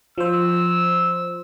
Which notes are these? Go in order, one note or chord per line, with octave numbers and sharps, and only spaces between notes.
F3 C5 E6